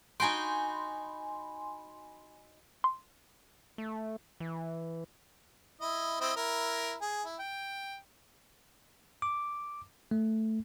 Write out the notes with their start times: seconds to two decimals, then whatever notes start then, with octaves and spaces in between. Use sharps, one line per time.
0.20 D#4 F#4 G5 G#5 B5 C6
2.84 C6
3.78 A3
4.40 E3
5.81 E4 D#5
6.20 C4 E4 D#5
6.36 E4 A#4
7.01 G#4
7.24 E4
7.39 G5
9.22 D6
10.11 A3